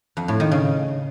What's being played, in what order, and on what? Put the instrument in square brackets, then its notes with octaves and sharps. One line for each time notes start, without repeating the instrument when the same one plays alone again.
[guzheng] F2
A2
D#3
C#3